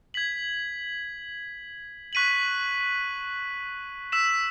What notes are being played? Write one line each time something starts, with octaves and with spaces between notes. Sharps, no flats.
G#6 B6 F#7
C#6 F#6 B6 D#7 F#7
E6 B6 E7